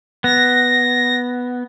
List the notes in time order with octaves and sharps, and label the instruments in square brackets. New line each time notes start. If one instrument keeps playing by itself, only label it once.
[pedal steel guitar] B3 [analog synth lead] A#6